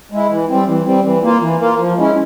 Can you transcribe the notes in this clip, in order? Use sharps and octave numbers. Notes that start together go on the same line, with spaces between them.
G#3 E4
E3
G3 C4
E3
G3 C4
E3
A#3 F4
E3
A#3 F4
F3
G#3 C#4 E4